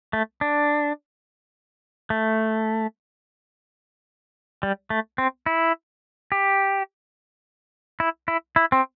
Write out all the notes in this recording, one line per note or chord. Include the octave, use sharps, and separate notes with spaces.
A3
D4
A3
G3
A3
C4
E4
G4
E4
E4
E4
C4